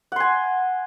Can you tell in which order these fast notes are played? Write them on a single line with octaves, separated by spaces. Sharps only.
F#5 C6 G#5